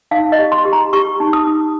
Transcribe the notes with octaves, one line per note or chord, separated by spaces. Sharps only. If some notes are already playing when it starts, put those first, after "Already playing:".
D#4 F5
D#5
G4
C6
G4
A#5
G4 C#6
D#4
D#6
D#4